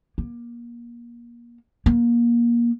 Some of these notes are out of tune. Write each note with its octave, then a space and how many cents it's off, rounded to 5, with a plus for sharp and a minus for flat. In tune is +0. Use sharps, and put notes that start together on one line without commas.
A#3 +25
A#3 +20